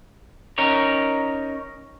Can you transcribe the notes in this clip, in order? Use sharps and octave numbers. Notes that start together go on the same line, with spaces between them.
C#4 D#4 A#4 C#5